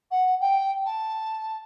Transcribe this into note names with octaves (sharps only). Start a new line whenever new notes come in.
F#5
G5
A5